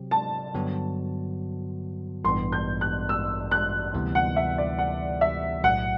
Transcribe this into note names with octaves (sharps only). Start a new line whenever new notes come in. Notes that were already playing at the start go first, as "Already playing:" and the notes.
Already playing: C3 F#3 C4 G4
A5
G2 D3 F#3 B3 F#4
A1 G2 E3 B3 C6
G6
F#6
E6
F#6
D2 C3 E3 G3 B3
F#5
E5
D5
F#5
E5
B1 A2 F#3 F#5